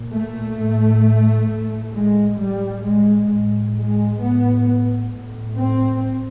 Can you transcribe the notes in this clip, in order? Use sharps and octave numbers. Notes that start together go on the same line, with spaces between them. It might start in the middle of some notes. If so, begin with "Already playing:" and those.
Already playing: A#2
A3
A2
A2
G#3
A2 G3
G#3
A2
G#3
A2 B3
A2
C4